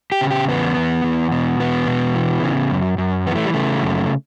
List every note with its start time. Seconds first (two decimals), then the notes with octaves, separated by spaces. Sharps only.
0.12 G4
0.21 C#3
0.31 G4
0.48 E2 B3
0.77 E2
1.04 E2
1.32 B2
1.60 E2 B3
1.87 B2
2.15 E3
2.43 C#3
2.71 F#2
2.98 F#2
3.26 E3 B3
3.36 A3
3.44 G3
3.54 C#3 A3
3.82 F#2